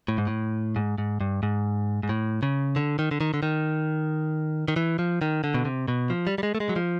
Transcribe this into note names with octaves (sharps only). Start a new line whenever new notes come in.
A2
G#2
A2
G#2
G#2
G2
G#2
G#2
A2
C#3
D3
D#3
D3
D#3
D3
D#3
D#3
E3
F3
D#3
D3
B2
C3
B2
F3
G3
G3
G#3
A3
G#3
F#3
F3